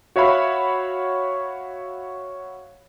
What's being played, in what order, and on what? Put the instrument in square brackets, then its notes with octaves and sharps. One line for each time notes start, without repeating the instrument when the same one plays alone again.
[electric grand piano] F#4 C#5 E5 F5 B5